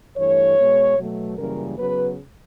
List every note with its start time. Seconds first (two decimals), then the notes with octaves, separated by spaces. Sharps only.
0.16 G2 E3 A3 C#5
0.57 B2 G#3 B3
0.97 B2 F#3 A3
1.37 F#2 C#3 E3 G3 A#3 A#4
1.77 C#3 F#3 B3 B4